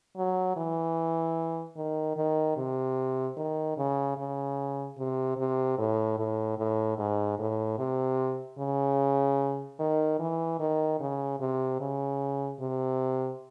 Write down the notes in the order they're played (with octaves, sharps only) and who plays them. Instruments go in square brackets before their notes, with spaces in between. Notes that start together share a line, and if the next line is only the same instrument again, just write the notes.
[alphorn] F#3
E3
D#3
D#3
C3
D#3
C#3
C#3
C3
C3
A2
A2
A2
G#2
A2
C3
C#3
D#3
E3
D#3
C#3
C3
C#3
C3